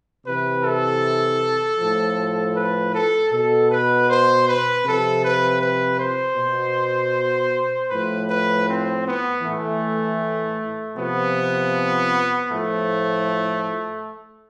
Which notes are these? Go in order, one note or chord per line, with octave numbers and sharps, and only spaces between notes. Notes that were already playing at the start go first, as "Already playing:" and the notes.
C3 B4
E3
A4
A2 F3
B4
A4
B2 A4
B4
C5
B4
C3 F3 A4
B4
B4
C5
B2
A2 F3 B4
B4
C4
B3
A2 E3 A3
C3 F3 B3
A2 F3 A3